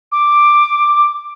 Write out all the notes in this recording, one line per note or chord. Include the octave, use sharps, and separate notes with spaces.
D6